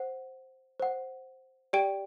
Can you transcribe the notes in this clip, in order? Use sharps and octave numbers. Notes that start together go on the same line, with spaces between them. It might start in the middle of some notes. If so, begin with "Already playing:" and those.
Already playing: C5 F#5
C5 F#5
G4 D5 G5 D7